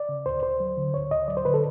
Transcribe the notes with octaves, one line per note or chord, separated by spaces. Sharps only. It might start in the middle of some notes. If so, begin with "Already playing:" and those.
Already playing: D5
C#3
D2 C5
D2 C5
F#3
D3
D2 C#5
D2 D#5
F#3 D5
C5
D3 B4
A4